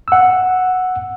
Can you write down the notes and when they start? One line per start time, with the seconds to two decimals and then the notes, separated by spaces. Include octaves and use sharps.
0.08 F#5 E6